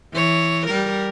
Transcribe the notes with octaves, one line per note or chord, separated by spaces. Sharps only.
E3 C#5
G3 A#4